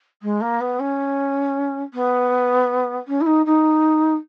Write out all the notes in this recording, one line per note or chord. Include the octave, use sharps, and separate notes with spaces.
G#3
A#3
B3
C#4
B3
C#4
E4
D#4
D#4